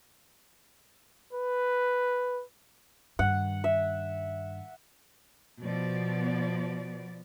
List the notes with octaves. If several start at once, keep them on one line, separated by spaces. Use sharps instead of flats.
B4
G2 D#3 F#5
E5
B2 F3 B3 D5